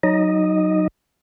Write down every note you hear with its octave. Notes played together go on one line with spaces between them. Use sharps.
F#3 D#4 D#5